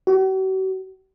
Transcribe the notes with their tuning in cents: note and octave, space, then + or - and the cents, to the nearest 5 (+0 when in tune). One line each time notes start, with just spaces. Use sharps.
F#4 +45